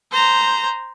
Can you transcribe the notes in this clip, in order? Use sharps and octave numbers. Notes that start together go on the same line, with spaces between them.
C5 A#5